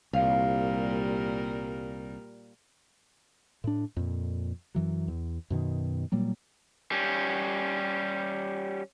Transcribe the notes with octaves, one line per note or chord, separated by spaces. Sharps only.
C2 A#2 G3 A#4 F5
A2 D4
F2 A#2
F#2 E3 F#3
E2
F#2 B2 D#3
A#2 F#3 G3 A#3
G3 C#4